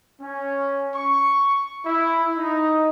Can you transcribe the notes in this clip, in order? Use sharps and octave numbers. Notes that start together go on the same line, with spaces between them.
C#4
C#6
E4
D#4